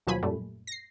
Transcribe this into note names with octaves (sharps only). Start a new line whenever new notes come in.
D#2 B2 F3 F#3 G#5 B5
F#2 A#2 G3 A3
A#6 C7